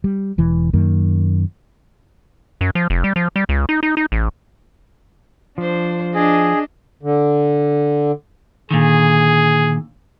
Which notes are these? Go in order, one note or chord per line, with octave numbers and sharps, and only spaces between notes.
G3
E1 E3
F#2 D#3 A#3
F#2
F3
F1
G3
F3
G3
C#2
D#4
D#4
D#4
A1
F3 D4 C5
D4 G#4 D#5
D3
A#2 D3 D#3 G#4